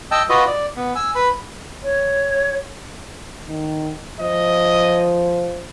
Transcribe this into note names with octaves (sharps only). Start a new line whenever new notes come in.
D#5 G5 A5 E6
F4 F#4 B4 D#5
D5
B3
G#5 E6
B4 B5
C#5
D#3
F3 D#5